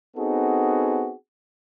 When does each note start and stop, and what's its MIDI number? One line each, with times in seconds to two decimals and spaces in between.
0.17 1.12 59
0.17 1.12 60
0.17 1.12 63
0.17 1.12 66
0.17 1.12 68
0.17 1.12 69